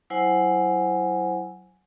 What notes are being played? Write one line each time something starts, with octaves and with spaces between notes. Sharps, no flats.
F#3 E4 C5 F#5 G#5